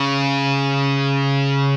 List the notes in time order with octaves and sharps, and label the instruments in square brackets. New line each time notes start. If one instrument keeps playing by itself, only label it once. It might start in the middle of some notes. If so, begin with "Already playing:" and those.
Already playing: [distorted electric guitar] C#3